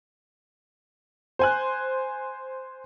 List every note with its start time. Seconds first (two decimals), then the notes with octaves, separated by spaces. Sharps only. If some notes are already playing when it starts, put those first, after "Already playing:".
1.39 C5 G#5 F#6